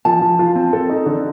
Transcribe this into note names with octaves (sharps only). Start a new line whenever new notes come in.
F3 A5
F3
F4
C4
A4
D#4
D3